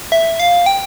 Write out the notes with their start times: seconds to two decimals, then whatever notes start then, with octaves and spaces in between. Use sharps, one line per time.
0.12 E5
0.40 F5
0.66 G5